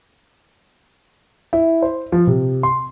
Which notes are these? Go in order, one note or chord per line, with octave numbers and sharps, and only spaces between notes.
E4
C5
F3
C3
C6